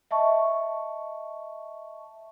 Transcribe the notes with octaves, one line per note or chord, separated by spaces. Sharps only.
D#5 E5 A5 C#6